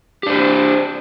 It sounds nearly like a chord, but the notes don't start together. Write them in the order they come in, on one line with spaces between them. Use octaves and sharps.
G4 D4 C5